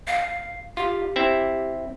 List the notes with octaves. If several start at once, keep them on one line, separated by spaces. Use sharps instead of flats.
F5
F4 G4
C4 E4 E5